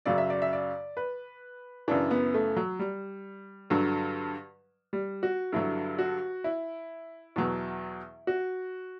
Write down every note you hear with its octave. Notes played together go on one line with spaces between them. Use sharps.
F#2 C#3 F#3 D5
E5
D5
E5
D5
B4
F#2 C#3 E3 D4
B3
A3
F#3
G3
G2 D3 F#3
G3
F#4
G2 D3 F#3 E4
F#4
E4
E2 B2 F#3
F#4